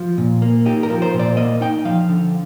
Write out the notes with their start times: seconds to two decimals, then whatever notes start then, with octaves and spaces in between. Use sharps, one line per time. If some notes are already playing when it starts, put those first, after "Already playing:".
Already playing: F3
0.18 A#2
0.42 A#3
0.66 D#4 G4
0.83 A#4
0.90 F3
1.02 C5
1.14 A#2
1.19 D5
1.37 A#3 D#5
1.61 D#4 G5
1.85 F3 F5
2.09 D3